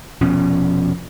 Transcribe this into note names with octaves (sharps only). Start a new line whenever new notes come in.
F1 B2 F3 C#4